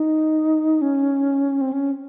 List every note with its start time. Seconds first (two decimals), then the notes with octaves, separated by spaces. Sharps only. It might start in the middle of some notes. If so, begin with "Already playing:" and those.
Already playing: D#4
0.82 C#4
1.61 C4
1.73 C#4